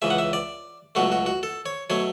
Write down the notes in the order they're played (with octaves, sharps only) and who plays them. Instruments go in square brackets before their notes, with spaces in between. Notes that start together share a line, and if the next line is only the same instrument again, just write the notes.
[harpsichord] C#2 C#3 E3 E5
F#5
E5
D5
C#2 B2 F#3 A3 F#4
F#4
F#4
A4
C#5
B2 F#3 A3 C#5